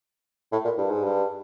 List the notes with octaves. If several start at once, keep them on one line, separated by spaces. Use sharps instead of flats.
A2
A#2
G2
G#2
G2